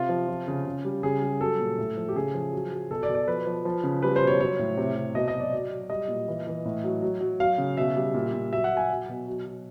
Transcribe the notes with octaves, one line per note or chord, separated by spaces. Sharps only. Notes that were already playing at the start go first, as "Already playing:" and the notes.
Already playing: C3 F4
F3
F3
C#3
C#3
G3
C#3 G#4
G3
F#3 A4
A#2
A2
F3
G4
C#3 G#4
F3
F#3
F#3
B2 A4
D5
B2
D5
F3 B4
F3
F3
C#3
G3 B4
C5
B2
C#5
F#3 C#5
A2
C3
C3
B2 D#5
D#5
F#3
D5
F#3
F#3
G3 D#5
A#2
E3
E3
A2
F#3
F#3
F#3
F#3 F5
C#3
B2 E5
G3
A#2
A#2
F#3 E5
F#5
F#3
G#5
F#3
B2
F#3
F#3